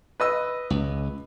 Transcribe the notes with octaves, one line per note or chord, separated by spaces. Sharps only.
B4 D#5 E6
C#2